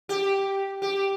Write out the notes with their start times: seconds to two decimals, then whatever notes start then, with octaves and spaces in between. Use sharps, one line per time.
0.09 G4
0.82 G4